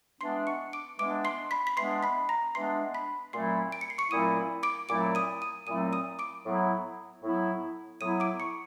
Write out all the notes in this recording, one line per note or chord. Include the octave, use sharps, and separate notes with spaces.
E3 G#3 B3 D4 C6 C7
C#6 C#7
D6 D7
E3 G#3 B3 D4 D6 D7
C6 C7
B5 B6
B6
E3 G#3 B3 D4 C6 C7
B5 B6
A#5 A#6
E3 G#3 B3 D4 C6 C7
B5 B6
A#2 F#3 A3 C4 E4 C6 C7
D7
C#7
C7
C#6 C#7
A#2 F#3 A3 C4 E4 D#6 D#7
D6 D7
A#2 F#3 A3 C4 E4 D6 D7
D#6 D#7
D#6 D#7
A#2 F#3 A3 C4 E4 D#6 D#7
D#6 D#7
D6 D7
A2 F#3 B3 E4
A2 F#3 B3 E4
A2 F#3 B3 E4 D#6 D#7
D6 D7
C#6 C#7